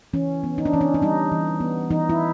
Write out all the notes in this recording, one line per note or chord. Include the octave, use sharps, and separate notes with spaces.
E3 C#4
B3
D#4
D4
E3 C#4
D4
D4
G3 D#4
E3
B3
E3 D#4
E4